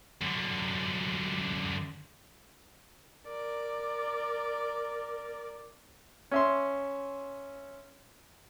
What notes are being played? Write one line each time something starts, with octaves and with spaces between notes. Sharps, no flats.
F#2 D3
A#4 D5
C#4 E5 C6